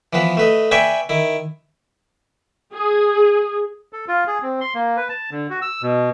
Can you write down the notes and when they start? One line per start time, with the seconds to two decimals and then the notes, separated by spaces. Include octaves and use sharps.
0.13 E3 F3 B3 B4
0.37 A3 B4 D#5
0.71 B4 D5 E5 G5 G#5 C#6
1.09 D#3 E4
2.74 G#4
3.93 A4
4.08 F4
4.27 G#4
4.42 C4
4.61 C6
4.74 A#3
4.97 B4
5.09 A5
5.31 D3
5.50 F#4
5.62 E6
5.82 B2